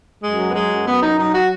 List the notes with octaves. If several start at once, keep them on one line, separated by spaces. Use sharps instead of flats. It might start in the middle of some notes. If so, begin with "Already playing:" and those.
F#2 G#3
F#3
B3
F#3 G#3
F#2
F#2 B3
F#3 D#4
F#3 D#4
F#4